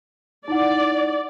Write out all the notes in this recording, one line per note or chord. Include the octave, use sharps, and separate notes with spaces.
D#4 E4 D5 F#5